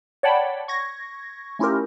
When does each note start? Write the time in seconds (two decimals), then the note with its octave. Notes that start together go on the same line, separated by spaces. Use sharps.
0.23 C#5 D5 F#5 G5 A5 B5
0.68 C#6 G#6 A#6
1.59 A3 C#4 E4 F4 G4 A#4